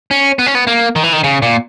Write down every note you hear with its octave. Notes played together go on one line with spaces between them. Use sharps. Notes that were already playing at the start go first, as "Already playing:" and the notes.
C#4
B3
C#4
B3
A#3
D#3
E3
D#3
C#3
A#2